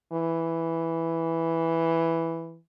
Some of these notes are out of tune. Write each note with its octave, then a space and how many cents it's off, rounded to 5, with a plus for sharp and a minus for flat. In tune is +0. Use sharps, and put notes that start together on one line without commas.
E3 +0